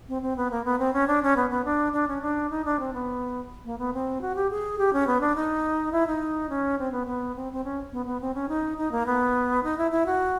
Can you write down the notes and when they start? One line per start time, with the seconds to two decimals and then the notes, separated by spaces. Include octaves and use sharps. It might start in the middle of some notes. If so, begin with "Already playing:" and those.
0.09 C4
0.22 C4
0.37 B3
0.51 A#3
0.65 B3
0.79 C4
0.93 C#4
1.07 D4
1.23 C#4
1.36 B3
1.50 B3
1.65 D4
1.93 D4
2.08 C#4
2.22 D4
2.50 D#4
2.65 D4
2.79 C4
2.93 B3
3.65 A#3
3.79 B3
3.94 C4
4.21 F#4
4.35 G4
4.51 G#4
4.78 G4
4.93 C#4
5.07 B3
5.21 D4
5.35 D#4
5.92 E4
6.07 D#4
6.49 C#4
6.79 C4
6.92 B3
7.07 B3
7.35 C4
7.53 C4
7.64 C#4
7.92 B3
8.06 B3
8.21 C4
8.34 C#4
8.49 D#4
8.78 D#4
8.92 A#3
9.06 B3
9.63 D#4
9.78 E4
9.91 E4
10.06 F#4